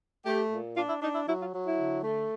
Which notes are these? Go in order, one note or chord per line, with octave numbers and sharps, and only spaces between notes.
A3 G4
A#2
D4 F4
E4
D4 D#4
E4
F#3 E4
F4
F#3
E4
D3
A3